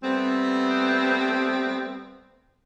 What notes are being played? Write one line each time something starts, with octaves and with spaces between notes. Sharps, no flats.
G3 A3 B3 C4